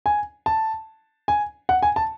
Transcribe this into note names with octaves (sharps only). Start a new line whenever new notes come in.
G#5
A5
G#5
F#5
G#5
A5